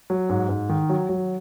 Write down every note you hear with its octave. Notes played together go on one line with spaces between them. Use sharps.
F#3
G#2
G#2
D#3
F#3
F#3